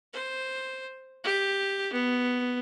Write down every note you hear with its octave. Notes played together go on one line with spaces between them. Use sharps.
C5
G4
B3